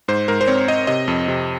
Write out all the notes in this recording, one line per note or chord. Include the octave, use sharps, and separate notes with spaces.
G#2 C5
G#2 A#4
C5
C4 C#5
C4 D#5
C3 D#5
F2
C3